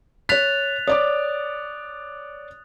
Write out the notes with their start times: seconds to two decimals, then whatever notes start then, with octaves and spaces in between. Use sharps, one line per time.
0.29 C#5 F#6 A6 B6 F7
0.88 C#5 D5 D6 D#6